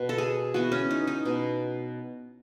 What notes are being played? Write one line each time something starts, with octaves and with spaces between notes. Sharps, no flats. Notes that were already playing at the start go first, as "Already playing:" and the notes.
Already playing: B2 B4
A4
G#4
E3 B3 F#4
C#4
D#4
D#4
B2